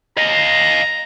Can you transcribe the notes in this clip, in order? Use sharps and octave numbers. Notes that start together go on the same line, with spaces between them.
D#5 F5 A#5